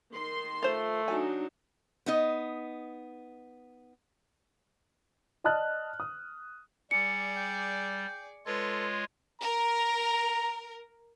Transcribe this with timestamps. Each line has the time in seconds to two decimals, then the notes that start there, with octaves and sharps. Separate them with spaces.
0.11 D#3 C6
0.63 A3 F4 C5
1.08 F#3 D4 D#4 G#5
2.06 B3 D#4 D#5
5.44 D5 D#5 A5 D#6 F6 F#6
6.00 D#6
6.91 G3 G#4 D5 C#7
7.37 G5
8.46 G#3 F4 A4 B4 C#5
9.42 A#4 A#5